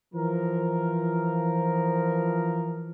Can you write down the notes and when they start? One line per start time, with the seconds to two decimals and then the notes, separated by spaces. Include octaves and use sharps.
0.14 E3 F3 A#4